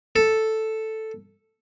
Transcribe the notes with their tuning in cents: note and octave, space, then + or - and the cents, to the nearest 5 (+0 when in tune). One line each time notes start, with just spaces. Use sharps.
A4 +0